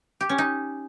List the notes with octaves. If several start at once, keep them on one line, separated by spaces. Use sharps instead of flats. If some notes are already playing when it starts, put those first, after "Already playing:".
G4
C#4
D#4